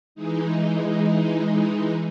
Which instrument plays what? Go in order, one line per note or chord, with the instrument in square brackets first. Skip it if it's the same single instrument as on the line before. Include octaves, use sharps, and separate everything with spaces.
[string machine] E3 G#3 D#4